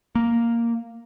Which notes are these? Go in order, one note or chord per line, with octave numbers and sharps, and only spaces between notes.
A#3